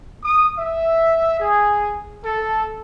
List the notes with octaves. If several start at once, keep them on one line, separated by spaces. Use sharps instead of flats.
D#6
E5
G#4
A4